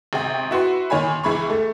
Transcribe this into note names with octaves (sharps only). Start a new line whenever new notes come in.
G#1 C3 G5
E4 F#4 B4 C6
A#2 D#3 C#5 G#5 B5
C#2 E3 G#4 B5 C#6
A3